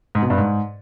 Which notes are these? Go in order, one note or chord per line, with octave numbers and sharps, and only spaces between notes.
G#2
B2
G2
G#2